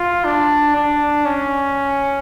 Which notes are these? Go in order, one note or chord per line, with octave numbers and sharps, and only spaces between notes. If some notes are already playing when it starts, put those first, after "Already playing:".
Already playing: F4
D4
D4
C#4